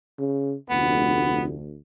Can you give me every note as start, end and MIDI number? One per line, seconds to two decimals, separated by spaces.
0.19 0.55 49
0.70 1.56 29
0.70 1.77 38
0.70 1.43 59